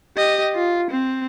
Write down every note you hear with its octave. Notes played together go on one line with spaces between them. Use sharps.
G4 D#5
F4
C4